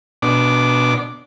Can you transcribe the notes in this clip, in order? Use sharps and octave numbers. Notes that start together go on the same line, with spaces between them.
B2 D4 D6